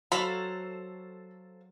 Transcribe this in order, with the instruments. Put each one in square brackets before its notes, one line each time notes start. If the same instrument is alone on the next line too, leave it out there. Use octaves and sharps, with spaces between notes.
[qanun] F#3 F#4 [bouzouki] A4 C5 F5 [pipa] B5